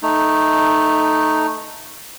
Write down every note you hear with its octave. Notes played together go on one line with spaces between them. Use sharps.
A3 D#4